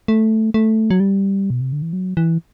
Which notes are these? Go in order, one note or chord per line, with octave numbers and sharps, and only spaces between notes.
A3
A3
F#3
G3
B2
C3
D3
E3
F#3
E3